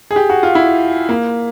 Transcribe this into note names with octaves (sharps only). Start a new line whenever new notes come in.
G#4
G4
F#4
F4
E4
A#3